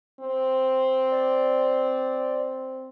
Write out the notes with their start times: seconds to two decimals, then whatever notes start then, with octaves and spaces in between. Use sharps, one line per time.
0.20 C4
1.11 D5